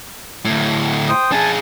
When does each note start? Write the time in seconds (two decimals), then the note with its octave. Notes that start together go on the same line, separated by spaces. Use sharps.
0.45 D2 A2
1.09 C5 G5 D#6
1.32 D4 G#4 G#5 A5